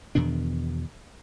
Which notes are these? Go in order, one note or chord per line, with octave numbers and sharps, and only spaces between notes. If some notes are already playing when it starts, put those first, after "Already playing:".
E2 B2 D#3 D4